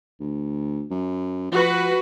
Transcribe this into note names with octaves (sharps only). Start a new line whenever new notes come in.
D2
F#2
F3 F#4 B4